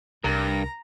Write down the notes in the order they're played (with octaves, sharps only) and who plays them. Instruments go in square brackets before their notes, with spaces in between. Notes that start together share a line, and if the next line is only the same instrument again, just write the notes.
[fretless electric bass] C2 [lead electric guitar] G2 [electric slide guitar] A#4 [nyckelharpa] A#5